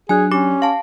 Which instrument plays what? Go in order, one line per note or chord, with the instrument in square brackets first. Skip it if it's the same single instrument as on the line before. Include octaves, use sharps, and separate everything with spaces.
[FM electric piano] F#3 D4 [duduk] G#4 [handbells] G#5 F#6
[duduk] C#4 [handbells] G4 D6
[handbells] F5 A5 [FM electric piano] C6